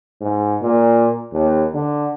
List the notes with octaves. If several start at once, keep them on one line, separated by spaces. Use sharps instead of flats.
G#2
A#2
D#2
D3